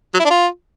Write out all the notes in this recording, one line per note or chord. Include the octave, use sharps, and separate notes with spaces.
F#3
E4
D4
F4